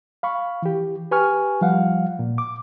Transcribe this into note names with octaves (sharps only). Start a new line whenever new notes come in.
F5 B5 C#6
E3 G4
G4 B4 G#5 C#6 F6
F3 G3 F5 F#5
A#2
D6